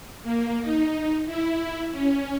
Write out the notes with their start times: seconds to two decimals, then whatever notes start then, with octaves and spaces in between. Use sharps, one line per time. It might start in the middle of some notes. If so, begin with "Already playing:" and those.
0.23 A#3
0.62 D#4
1.26 E4
1.92 C#4